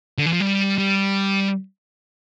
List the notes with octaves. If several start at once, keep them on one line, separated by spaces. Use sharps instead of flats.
D3
E3
F3
G3
G3